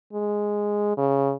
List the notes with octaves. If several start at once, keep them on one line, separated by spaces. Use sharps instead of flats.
G#3
C#3